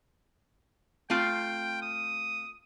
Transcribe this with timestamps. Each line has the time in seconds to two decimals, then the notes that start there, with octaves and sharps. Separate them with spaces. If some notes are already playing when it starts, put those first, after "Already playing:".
1.10 A3 C4 F4 G5
1.82 D#6